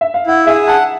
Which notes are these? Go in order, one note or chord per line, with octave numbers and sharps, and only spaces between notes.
E5
F5
E4 F#5
G#4 E5
F#5 A5